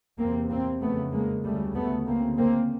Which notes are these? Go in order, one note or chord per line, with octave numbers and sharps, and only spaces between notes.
E2 C3 A#3 C4
A#3 C4
F2 C#3 A3 B3
G#3 A#3
D2 C#3 G3 A3
A3 B3
D2 C#3 A#3 C4
A#3 C4